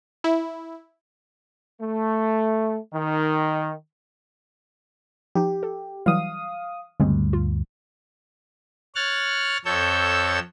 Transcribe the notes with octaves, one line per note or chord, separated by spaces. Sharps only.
E4
A3
D#3
F3 D#4 G4
A4
E3 F#3 G3 F5 D#6
D2 G2 C#3 G#3 C4
F4
C#5 F6 F#6 A6
F2 A4 C#5 E6 G6